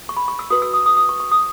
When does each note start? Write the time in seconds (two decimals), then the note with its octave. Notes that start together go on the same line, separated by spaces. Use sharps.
0.09 C#6
0.17 B5
0.28 C#6
0.39 E6
0.50 F#4 B4 D#6
0.62 E6
0.73 D#6
0.86 D#6
0.97 D#6
1.09 C#6
1.20 C#6
1.31 D#6